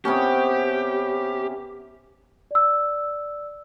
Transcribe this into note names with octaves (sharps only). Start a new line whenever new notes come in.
C3 B3 C#4 G4
D5 E6